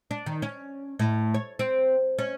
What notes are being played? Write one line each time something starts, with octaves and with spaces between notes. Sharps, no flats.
D4
D#3
C#4
A2
C#5
C4
C#4